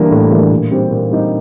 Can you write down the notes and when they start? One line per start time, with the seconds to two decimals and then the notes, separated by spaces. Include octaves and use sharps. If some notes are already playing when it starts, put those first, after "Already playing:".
Already playing: E3 G3 A#3 D4
0.10 A2
0.31 E3 G3 A#3 D4
0.51 A#2
0.71 G3 C4 D#4 G4
0.91 A#2
1.11 G3 C4 D#4 G4